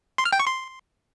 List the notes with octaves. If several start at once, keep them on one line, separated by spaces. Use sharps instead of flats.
C6
F6
G5
C#6
C6